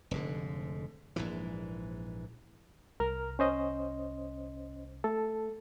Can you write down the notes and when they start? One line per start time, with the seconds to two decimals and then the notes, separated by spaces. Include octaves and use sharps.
0.11 F1 G#2 D3
1.16 A#1 G#2 E3
3.00 C2 A#4 F6
3.39 C#4 C5 D#5
5.04 A3 A4